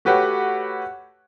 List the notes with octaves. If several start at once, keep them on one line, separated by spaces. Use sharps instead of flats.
A3 F#4 G4 B4 C#5 F#5